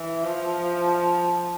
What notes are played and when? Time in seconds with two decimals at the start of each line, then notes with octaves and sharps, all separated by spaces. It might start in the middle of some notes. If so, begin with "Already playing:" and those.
Already playing: E3
0.24 F3